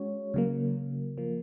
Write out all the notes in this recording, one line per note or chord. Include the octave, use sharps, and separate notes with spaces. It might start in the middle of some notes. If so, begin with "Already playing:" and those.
Already playing: G#3 C#4 F#4 C#5
C#3 F#3 A#3
F3 A#3